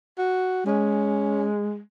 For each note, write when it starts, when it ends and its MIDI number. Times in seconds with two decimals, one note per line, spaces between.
0.18 0.65 66
0.66 1.80 56
0.66 1.48 61